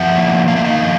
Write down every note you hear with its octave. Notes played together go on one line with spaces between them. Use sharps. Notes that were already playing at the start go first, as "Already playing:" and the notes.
Already playing: F3 E5 F#5
A#3
A#3 F5
E5
D#5 F5
F3